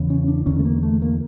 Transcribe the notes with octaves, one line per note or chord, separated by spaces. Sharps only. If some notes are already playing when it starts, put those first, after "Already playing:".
Already playing: E2 C#3
C#4
D4
E2 D3 C#4
A3
A#3
A3
A#3